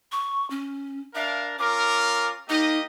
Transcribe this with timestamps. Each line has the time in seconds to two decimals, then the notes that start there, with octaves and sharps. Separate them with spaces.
0.12 C#6
0.50 C#4
1.15 D4 A#4 E5 F5
1.59 C#4 F4 A#4 D6
2.49 A#3 D#4 G4 D#5